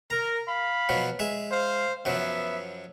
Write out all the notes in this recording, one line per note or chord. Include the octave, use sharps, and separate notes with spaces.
A#4 A#5
F5 B5
B2 F3 F#3
G#3 E5
C5 F5
F#2 F3 F#3 B3 E5